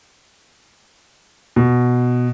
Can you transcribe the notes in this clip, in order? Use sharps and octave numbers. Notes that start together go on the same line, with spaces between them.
B2